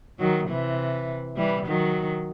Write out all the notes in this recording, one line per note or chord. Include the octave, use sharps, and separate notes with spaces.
D#3 F#3
C3 E3
E3 G3
D#3 F#3